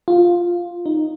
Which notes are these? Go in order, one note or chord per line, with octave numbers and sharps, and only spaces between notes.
F4
D#4